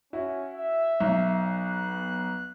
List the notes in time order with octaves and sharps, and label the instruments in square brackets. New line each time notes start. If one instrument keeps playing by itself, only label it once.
[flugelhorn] C#4 [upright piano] E4 F#4
[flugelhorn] E5
[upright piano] B1
[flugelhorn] B3 [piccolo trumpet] F#6